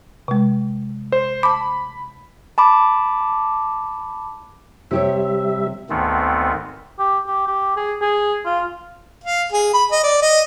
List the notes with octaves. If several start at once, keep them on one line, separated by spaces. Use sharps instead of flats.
C3 G#3
C5
A5 B5 D6
A5 B5 D6
C3 G3 G4 C#5 E5
D2 G#2 D#3 A3 B3 C4
G4
G4
G4
G#4
G#4
F4
F5
G#4
B5
D#5
D5
D#5